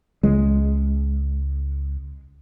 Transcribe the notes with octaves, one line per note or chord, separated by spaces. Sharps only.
C#2 G#3